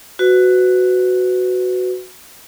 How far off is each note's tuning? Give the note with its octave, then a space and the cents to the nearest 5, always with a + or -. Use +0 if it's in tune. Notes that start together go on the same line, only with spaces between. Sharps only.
F#4 +0 B4 +25